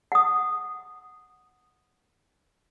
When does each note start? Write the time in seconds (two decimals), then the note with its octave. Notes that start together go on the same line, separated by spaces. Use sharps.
0.12 F#5 D#6